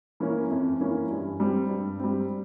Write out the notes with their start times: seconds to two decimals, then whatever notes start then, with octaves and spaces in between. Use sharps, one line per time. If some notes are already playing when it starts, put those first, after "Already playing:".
0.20 E3 A#3 C#4
0.50 F2
0.81 E3 A#3 C#4
1.11 G2
1.40 G3 C4
1.70 G2
2.00 G3 C4